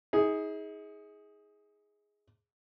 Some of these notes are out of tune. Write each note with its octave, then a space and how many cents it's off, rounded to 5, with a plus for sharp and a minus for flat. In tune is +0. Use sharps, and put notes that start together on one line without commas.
D#4 +40 G#4 +0